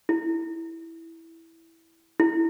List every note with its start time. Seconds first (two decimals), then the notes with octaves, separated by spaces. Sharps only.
0.09 E4
2.20 E4